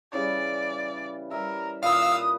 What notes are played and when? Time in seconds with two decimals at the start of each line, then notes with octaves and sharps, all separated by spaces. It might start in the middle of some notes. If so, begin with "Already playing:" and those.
0.13 C#3 E3 G3 D5
1.31 G3 A#4 E5
1.83 A#2 B4 F5 D#6 E6